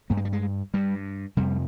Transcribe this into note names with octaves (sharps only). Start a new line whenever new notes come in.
G2 A#3
G#3
G3
G#3
G2 G3
F2 C3 G3